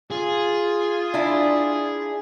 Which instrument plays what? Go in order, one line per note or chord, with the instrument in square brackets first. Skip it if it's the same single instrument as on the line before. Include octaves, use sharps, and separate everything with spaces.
[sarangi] F4 [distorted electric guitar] G#4
[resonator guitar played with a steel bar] D4 E4